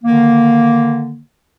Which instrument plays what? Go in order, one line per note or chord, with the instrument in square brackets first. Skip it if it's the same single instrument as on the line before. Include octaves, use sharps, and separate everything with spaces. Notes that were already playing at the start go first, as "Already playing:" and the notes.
[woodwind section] D3 D#3 A#3